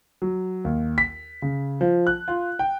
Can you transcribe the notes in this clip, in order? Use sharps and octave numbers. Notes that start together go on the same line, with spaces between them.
F#3
D#2
B6
C#3
F3
F#6
F4
G5